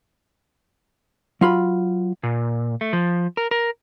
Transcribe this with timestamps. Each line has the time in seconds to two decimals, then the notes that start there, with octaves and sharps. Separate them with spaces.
1.41 F#3 F4 B5
2.23 A#2
2.81 A3
2.93 F3
3.37 A#4
3.51 A#4